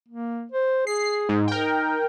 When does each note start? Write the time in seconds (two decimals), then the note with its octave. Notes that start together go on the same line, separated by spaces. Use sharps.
0.08 A#3
0.52 C5
0.87 G#4 C7
1.29 G#2
1.48 D#4 A#4 G5